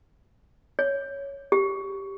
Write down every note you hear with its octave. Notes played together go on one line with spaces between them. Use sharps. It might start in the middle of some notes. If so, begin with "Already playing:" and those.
C#5
G4